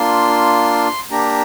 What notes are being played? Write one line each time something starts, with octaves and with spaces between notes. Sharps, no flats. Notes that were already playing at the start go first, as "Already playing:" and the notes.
Already playing: A#3 D4 F4 C6
A#3 D4 G4 A#5